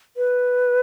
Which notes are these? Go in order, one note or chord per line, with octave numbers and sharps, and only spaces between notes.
B4